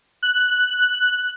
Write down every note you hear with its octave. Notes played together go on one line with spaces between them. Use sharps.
F#6